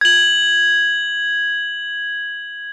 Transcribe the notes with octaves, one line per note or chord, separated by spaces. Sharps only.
G#6 F#7